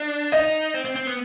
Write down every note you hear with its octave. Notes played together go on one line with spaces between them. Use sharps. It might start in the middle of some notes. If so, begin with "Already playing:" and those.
Already playing: D4
D#4 D#5
C4
C4
C4
B3